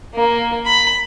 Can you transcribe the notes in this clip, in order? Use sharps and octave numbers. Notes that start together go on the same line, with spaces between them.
A#3
B5